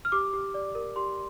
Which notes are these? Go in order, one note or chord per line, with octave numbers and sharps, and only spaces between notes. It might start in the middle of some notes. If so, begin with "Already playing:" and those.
F6
G4 D6
G4
D5
A#4
G4 C6